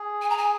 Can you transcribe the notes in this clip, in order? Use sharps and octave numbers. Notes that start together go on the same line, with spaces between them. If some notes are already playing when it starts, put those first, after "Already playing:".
Already playing: G#4
G#5
A#5
G#5